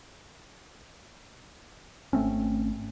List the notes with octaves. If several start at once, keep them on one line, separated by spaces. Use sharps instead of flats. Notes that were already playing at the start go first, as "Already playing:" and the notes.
G#1 A3 C4 C#4